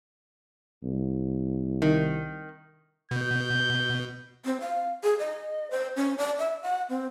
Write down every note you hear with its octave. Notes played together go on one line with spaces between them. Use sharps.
C2
D#3
B2 G6
C4
F5
G#4
D#5
C5
C#4
D5
E5
F#5
C4